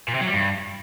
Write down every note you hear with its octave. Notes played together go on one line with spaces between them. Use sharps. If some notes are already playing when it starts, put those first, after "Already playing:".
A#2
C3
F#3
G3
G2